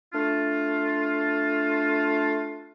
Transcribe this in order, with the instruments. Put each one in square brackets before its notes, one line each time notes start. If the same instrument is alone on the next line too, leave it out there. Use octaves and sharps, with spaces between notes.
[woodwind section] A3 D4 F4